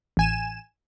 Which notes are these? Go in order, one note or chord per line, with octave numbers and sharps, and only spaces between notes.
A1 G#5 E7